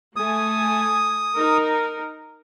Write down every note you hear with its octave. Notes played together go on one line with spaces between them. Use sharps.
A3 G#5 D#6
D#4 A#4